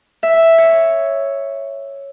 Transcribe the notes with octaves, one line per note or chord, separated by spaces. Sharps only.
E5
C#5